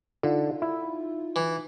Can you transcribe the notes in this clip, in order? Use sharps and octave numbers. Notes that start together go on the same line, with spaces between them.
D3 D#4 F4
E4
E3